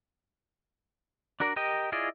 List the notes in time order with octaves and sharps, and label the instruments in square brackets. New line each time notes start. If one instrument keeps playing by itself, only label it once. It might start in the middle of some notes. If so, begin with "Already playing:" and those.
[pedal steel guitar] D4 F#4 A#4 D5
G4 A#4 D#5 G5
E4 F4 G#4 D5 D#5